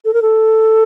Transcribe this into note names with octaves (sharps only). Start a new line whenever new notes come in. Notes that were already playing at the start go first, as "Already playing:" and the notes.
A4
A#4
A4